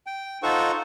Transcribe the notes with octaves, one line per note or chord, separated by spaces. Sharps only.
G5
D#4 F4 A4 C5 F#5 C#6